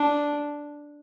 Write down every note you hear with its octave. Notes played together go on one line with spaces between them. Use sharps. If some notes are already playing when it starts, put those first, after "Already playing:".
Already playing: D4